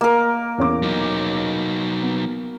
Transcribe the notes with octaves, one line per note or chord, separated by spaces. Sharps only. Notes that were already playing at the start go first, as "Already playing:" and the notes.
A#3 A#4
E2 C#4 D6
F#3 D#4
B3